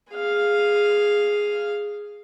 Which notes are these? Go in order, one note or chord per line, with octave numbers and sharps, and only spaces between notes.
G#4 F5